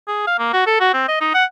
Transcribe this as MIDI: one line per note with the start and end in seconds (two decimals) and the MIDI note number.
0.08 0.22 68
0.27 0.38 77
0.39 0.53 58
0.53 0.64 66
0.66 0.76 69
0.80 0.91 66
0.94 1.05 60
1.08 1.19 75
1.21 1.33 63
1.34 1.44 78